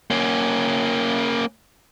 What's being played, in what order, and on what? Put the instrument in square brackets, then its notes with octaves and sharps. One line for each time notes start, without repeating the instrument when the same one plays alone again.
[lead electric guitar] A#3 C#4